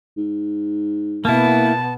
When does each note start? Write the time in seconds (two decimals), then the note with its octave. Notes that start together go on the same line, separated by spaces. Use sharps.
0.17 G#2
1.25 B2 A#3 B3 E4 A5